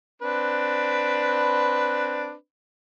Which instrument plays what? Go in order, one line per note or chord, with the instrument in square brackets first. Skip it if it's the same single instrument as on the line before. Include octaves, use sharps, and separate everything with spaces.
[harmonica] C4 D4 B4